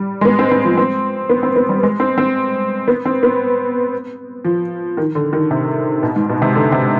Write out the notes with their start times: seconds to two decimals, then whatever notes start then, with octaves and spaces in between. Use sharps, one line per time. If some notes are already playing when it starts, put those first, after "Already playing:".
Already playing: G3
0.21 G#3
0.25 B3
0.39 C4
0.51 C4
0.65 F3
0.77 C4
1.29 B3
1.43 C4
1.56 B3
1.69 G3
1.83 G#3
2.00 C4
2.18 C4
2.88 B3
3.05 C4
3.23 B3
4.45 F3
4.97 D#3
5.15 D3
5.33 D#3
5.51 C3
6.03 B2
6.16 G#2
6.29 B2
6.42 C3
6.55 D3
6.72 C3